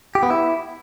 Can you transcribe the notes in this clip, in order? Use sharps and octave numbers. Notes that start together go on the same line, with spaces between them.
G4
B3
E4